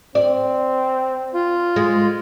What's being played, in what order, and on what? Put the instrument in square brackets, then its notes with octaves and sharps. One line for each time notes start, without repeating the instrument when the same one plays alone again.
[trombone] C4 [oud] D5
[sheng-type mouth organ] F4
[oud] G#3